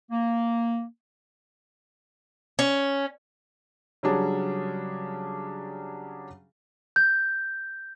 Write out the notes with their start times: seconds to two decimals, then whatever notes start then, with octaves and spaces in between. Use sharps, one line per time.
0.11 A#3
2.59 C#4
4.03 C#3 F#3 G3 C#4 D4 G#4
6.96 G6